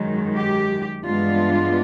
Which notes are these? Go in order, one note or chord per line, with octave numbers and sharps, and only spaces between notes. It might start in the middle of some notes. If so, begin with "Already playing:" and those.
Already playing: F#2 D#3 G#3
G4
G2 E3 G#3 B3 D4 F4